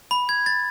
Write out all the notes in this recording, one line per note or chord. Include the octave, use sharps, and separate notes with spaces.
B5
G#6
A6